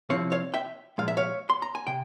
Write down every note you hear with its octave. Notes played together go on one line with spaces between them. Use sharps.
C2 C3 F3 C4 E4 C#5 F5
C#5 F5
E5 G5
A#2 F3 G#3 F5
E5
C#5 F5
C6
A#5
G#5
C3 G5